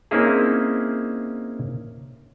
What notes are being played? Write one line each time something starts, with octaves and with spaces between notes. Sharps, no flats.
A#3 C4 C#4 D#4 E4 G#4